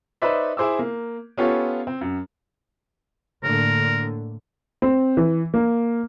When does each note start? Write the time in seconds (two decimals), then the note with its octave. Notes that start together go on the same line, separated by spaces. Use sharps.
0.22 D#4 B4 C5 D5 E5
0.57 E4 G#4 C5 D6 E6
0.79 A#3
1.37 B3 C#4 F4 G4 A4 C#5
1.87 C4
2.01 F#2
3.44 A2 D3 A#3 A#4
4.82 C4
5.17 E3
5.54 A#3